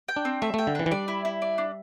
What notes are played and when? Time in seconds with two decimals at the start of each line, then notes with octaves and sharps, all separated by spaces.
0.08 G5
0.16 D4
0.25 C4
0.42 A3 E5
0.54 A3 G5
0.67 D3
0.75 E3 D4
0.86 E3
0.91 G3 D5
1.08 E4
1.25 E4
1.42 D5
1.58 D4